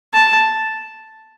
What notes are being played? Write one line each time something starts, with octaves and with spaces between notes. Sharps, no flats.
A5